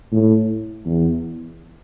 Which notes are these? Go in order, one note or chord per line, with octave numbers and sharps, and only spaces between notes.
A2
E2